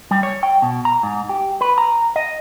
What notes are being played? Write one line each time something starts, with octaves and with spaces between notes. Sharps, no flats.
G3
C#5
G5
B2
A#5
G#2
G4
B4
A#5
D#5